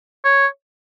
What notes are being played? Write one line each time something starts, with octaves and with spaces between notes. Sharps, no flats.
C#5